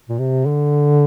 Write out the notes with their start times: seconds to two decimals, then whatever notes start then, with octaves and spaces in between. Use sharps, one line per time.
0.09 A#2
0.19 C3
0.46 D3